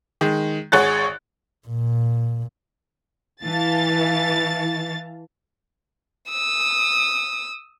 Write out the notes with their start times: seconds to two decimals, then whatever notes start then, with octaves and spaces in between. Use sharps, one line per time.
0.21 D#3 G#3
0.72 G#1 G#4 C#5 F#5 F#6 A6
1.68 A#2
3.44 E3 F5 A5 A6
6.30 D#6 E6